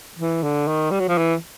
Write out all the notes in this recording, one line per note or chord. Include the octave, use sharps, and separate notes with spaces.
E3
D3
D#3
G3
F#3
F3
E3